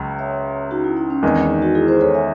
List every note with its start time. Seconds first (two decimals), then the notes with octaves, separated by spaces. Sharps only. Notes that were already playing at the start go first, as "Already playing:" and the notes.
Already playing: C#2 C#3 F#3
0.19 C#5 E5
0.71 D#4 F#4
0.84 E4
0.97 D#4
1.10 C#4
1.23 E2 D#3 G#3 C4
1.36 C#4
1.50 D#4
1.62 D#4 F#4
1.75 E4 G#4
1.88 G#4 C5
2.01 A4 C#5
2.14 E5 G#5